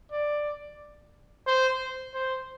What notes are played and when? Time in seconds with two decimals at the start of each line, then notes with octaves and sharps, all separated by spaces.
0.11 D5
1.47 C5
2.14 C5